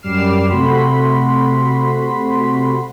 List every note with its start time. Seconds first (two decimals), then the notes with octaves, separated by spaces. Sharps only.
0.02 F#2 G3 D6 F6 C7 E7
0.49 C3 A3 F#4 B5 C6 B6